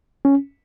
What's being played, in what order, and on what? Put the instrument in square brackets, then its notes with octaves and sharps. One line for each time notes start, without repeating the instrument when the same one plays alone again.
[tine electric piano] C#4